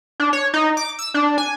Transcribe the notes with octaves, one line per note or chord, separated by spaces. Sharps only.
D4
C#5
D#4
D6
E6
D4
G#5